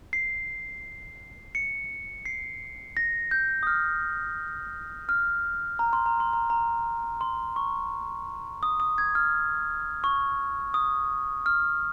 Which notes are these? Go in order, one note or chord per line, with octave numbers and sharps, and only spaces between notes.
C7
C#7
C7
A#6
G6
D#6
F6
F6
A#5
C6
A#5
C6
A#5
A#5
C6
C#6
D#6
D#6
G#6
F6
C#6
D#6
F6